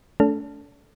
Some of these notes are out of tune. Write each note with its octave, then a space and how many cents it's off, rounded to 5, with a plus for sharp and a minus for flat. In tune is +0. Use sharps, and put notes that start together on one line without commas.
A3 -5 D4 -45 A4 -5